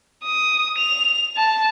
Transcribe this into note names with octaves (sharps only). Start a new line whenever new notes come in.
D#6
F7
A5